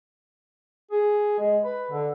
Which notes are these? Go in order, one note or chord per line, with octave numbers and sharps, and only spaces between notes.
G#4
G#3
B4
D3